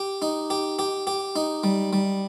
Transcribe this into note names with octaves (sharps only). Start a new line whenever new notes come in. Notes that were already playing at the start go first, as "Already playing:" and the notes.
Already playing: G4
D#4
G4
G4
G4
D#4
G3
G3